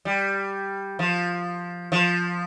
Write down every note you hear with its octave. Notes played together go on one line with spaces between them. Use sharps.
G3
F3
F3